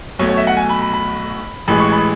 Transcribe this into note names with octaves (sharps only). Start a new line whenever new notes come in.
B1 B2 A3 C#5
C#5
E5
F#5
G#5
B5
B5
B5
A1 A2 E3 G#3 B5
C#6
B5